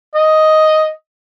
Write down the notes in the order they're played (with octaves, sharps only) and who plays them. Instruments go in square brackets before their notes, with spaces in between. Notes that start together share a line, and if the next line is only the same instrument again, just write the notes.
[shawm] D#5